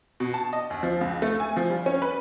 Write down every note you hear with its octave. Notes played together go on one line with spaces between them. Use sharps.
B2
A5
D#5
D#2
F3
C#2
A3
G#5
F3
G3
C#4
B4